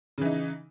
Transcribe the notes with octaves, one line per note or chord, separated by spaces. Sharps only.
C#3 E3 D#4